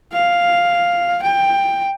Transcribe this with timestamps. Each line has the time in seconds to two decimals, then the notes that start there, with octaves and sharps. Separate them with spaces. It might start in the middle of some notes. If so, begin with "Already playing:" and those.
0.12 F5
1.23 G5